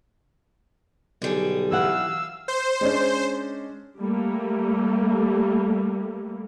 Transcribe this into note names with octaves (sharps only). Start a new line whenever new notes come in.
B1 D3 G3 G#4
E3 F5 F#5 E6
C5
G#3 C#4 D4
G3 A3 A#3